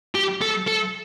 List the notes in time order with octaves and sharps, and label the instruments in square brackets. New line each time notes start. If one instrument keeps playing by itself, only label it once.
[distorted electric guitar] G4
A4
A4